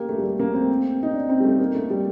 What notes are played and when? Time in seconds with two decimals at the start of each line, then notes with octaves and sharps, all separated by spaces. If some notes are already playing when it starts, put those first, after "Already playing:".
Already playing: A#3 G4
0.09 A3
0.18 G3
0.24 A3
0.40 A#3
0.54 C4
1.03 D#4
1.14 D4
1.29 C4
1.40 G3
1.45 A3
1.59 A#3
1.75 A3
1.90 G3